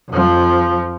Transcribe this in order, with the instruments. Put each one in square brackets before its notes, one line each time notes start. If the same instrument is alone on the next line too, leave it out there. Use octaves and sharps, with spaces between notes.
[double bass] F2 F3